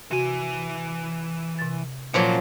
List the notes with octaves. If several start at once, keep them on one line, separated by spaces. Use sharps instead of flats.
C3 E3 F#4 G#5
C3 A6
A#2 F3 F#3 C#4 C6